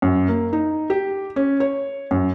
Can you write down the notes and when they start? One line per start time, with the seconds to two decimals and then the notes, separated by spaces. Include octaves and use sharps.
0.02 F#2
0.28 A#3
0.53 D#4
0.90 G4
1.36 C#4
1.60 C#5
2.11 F#2